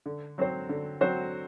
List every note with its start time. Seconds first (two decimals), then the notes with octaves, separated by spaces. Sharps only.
0.06 D3
0.38 F#3 C4 F#4 C5
0.69 D3
1.01 F#3 C4 F#4 C5